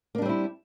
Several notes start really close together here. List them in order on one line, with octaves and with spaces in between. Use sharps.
A#3 D4 G3 C4 E4